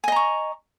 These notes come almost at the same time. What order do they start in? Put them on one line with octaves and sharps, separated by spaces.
G#5 D#5 A#5 C#6